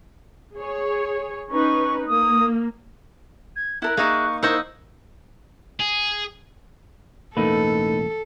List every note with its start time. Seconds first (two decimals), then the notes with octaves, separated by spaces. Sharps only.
0.56 G#4 C#5
1.50 C#4 D#4 B4 C#6
2.08 A#3 D#6
3.56 G#6
3.82 E4 A4 A#4 E5 F#6
3.97 A#3 D#4 G#4 E5 C#6
4.43 D#4 E4 A#4 C5 F#5 C#6 E6
5.80 G#4
7.37 E1 A1 A3 A#3 D#4 A4 B4